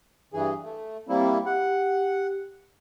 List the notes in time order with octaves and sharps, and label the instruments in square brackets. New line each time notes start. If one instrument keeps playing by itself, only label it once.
[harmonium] G2 E3 G#4
A3
[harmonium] G3 A#3 E4 [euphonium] C4
[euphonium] G4 [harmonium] F#5